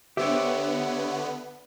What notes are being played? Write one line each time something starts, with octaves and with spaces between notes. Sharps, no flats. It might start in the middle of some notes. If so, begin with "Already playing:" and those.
D3 B3 G4 C5 C#5 E5